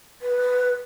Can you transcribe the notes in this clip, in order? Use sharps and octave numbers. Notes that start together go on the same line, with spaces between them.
B4